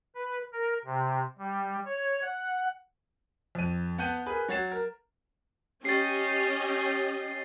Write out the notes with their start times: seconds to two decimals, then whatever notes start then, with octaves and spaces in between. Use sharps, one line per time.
0.15 B4
0.53 A#4
0.85 C3
1.38 G3
1.85 C#5
2.22 F#5
3.55 F2 D#7
3.98 B3 F#5 A5 G6 D#7
4.26 G#4 A#4 B4 B5
4.48 F#3 C#5 F#5 A6 C7 E7
4.72 A#4
5.85 C#4 G4 D#5 A6 C7